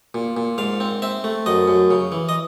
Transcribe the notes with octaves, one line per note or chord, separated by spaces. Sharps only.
A#2
A#2
G#2 F5
C4
C4 E5
A3
F#2 D#5
F#2
C#3
E3
D#5